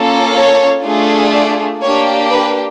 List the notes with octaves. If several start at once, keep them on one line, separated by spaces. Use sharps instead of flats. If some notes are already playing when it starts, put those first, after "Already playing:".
Already playing: A#3 C#4 F4 A4
C#5
A3 D4 F4 G#4
D5
A#3 D4 G4 C#5
B4